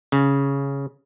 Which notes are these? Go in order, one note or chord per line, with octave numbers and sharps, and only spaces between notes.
C#3